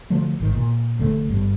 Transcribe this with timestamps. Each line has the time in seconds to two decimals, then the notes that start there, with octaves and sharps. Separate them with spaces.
0.10 D3 F3 F#3 A3
0.40 G#1 D#3
0.55 A#2
0.99 F1 D3 A3
1.30 G1 G2